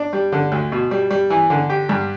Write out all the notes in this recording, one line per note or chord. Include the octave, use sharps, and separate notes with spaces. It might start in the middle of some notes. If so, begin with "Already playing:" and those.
Already playing: D4
G3
D3
D2
B2
G3
G3
E3
D3
G4
G2